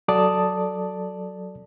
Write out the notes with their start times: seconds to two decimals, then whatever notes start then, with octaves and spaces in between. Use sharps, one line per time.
0.08 F#3 A4 D5 A5 D#6